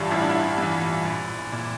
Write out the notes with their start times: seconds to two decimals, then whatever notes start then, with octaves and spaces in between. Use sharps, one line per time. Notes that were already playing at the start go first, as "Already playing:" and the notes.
Already playing: A1 G2 E3 D4 E4 F4
0.11 A1 E4
0.21 D4
0.30 E4
0.58 G2 E3
1.05 A#1
1.52 A#2